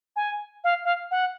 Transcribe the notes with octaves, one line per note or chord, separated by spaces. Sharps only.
G#5
F5
F5
F#5